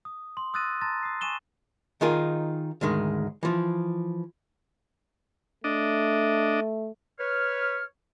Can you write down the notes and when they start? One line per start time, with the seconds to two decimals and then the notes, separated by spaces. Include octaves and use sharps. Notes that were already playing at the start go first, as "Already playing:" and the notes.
0.05 D#6
0.37 C6
0.54 D#6 E6 F#6 A6 A#6 D#7
0.81 A5 A#5 C6 A6 A#6
1.03 D#6 C7
1.21 G#5 C#6 D#7 E7 G7
2.01 D#3 D#4 F4 G#4 A#4
2.81 D2 G#2 D#3 G#3
3.43 E3 F3
5.64 A3 D4 D#5
7.20 B4 C#5 F6